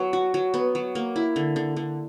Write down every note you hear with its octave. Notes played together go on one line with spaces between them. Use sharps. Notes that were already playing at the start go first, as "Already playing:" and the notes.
Already playing: F#3 B3
F#4
F#3
B3
F#3
A#3
E4
D3
D3
D3